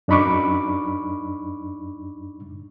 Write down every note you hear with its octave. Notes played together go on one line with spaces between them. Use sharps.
F#2 D4 D#4 B5 C#6 D6